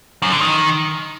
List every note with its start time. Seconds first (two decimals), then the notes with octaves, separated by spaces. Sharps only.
0.22 F#2
0.32 D3
0.41 D#3